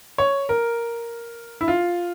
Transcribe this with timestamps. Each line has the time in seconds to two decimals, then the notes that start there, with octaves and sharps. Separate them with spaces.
0.18 C#5
0.49 A#4
1.61 E4
1.68 F4